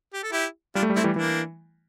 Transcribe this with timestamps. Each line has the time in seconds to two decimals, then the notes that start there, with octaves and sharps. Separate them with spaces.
0.14 G4
0.23 A4
0.32 E4 G4
0.75 G3 D4 F4
0.83 A3
0.90 G3
0.96 A3 C4 E4
1.04 E3 G3
1.16 E3 A#3 D4